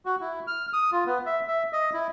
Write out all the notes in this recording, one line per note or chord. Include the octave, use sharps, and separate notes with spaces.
F#4
E4
F6
D#6
F4
B3
E5
E5
D#5
E4